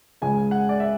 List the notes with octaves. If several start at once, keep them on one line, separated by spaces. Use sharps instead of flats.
C#2 C#3 G#3 G#5
F#5
D5
E5